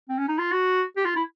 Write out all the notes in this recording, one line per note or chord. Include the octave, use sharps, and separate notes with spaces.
C4
C#4
D#4
F4
F#4
G4
F4
E4